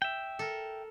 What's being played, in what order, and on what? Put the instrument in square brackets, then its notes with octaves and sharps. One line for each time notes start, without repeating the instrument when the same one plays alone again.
[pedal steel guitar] E5 G5
[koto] A4 A#4